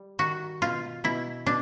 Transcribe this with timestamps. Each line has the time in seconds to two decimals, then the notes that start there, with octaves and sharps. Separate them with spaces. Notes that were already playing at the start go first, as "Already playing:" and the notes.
Already playing: G3
0.19 D#3 F#4
0.62 B2 F4
1.04 B2 E4
1.46 B2 D4